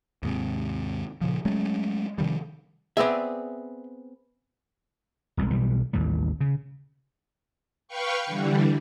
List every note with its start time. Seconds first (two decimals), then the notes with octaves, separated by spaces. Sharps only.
0.23 D#2 G#2 C3
1.21 A#2 C#3 F3
1.45 F#3 G#3 A3 C#4
2.18 C3 D#3 F3 G3
2.97 B3 C4 G#4 D5 E5
5.37 E1 C2 C#3 G#3
5.51 B1 E3 G3
5.93 A1 D#2 A2 G3
6.40 C#3
7.88 B4 F5 G5 C#6
8.26 D3 E3 G3